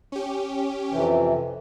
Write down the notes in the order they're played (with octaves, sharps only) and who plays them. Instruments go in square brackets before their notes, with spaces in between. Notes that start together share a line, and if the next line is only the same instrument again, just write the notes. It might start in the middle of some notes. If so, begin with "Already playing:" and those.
[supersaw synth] C#4 G4
[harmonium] F2 C3 E3